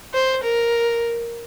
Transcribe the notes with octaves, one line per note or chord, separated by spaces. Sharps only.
C5
A#4